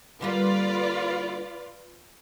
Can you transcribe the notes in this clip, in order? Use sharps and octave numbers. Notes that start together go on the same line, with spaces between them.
D3 G3 A#3 F4 B4 D5